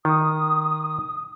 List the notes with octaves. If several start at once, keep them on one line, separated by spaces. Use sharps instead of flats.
D#3 D#6